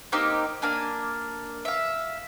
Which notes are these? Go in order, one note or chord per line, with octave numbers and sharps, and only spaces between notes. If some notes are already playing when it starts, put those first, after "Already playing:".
A#3 C4 D#4 G4
A#3 D4 G#5
E5 F5